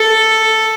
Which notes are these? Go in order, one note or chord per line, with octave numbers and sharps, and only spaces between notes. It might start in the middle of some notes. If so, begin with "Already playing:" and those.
Already playing: A4